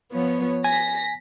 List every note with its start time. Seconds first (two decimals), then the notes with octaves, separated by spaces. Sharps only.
0.13 F3 B3 C#5
0.64 G#5 A#6 B6